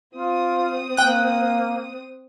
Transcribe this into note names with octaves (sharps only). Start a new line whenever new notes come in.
C4 F4 D#6
A#3 G5 F#6